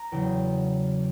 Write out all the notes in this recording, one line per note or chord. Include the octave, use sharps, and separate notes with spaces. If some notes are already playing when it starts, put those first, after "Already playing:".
Already playing: A#5
E2 C#3 F#3 G5